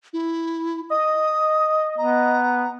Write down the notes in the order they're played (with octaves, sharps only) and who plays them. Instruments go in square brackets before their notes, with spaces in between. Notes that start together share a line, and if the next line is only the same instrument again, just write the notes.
[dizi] E4
[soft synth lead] D#5 [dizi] D#6
[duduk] B3 [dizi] A#5